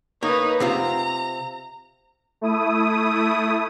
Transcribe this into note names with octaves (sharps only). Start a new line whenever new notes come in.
A#3 D#4 B4 C#5
C3 C4 F4 A#5
A3 E4 D#6